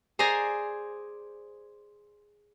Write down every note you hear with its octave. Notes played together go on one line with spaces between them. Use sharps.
G#4 C5 D5 G#5 A#5